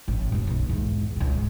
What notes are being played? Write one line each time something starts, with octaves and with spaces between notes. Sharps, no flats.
A1
F#1 B1
B1 C#3
E2 G#2
C#2 B2
G#2